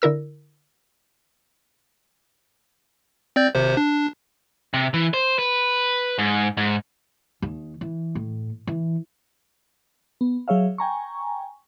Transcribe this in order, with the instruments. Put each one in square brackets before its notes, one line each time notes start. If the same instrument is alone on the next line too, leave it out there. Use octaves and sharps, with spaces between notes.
[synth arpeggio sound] D3 E4 A#4 E6
[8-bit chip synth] C4 D5 G6
G#1 C3 C5
D4
[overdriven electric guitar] C3
E3
C5
B4
G#2
G#2
[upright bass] D#2 D#3
E3
A2
E3
[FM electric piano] B3
F#3 G#4 C#5 E5 F5
G5 G#5 A#5 C#6